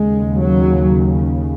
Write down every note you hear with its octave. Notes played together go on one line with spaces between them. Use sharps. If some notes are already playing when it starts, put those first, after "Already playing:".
Already playing: D#2 C#3 G#3
F#3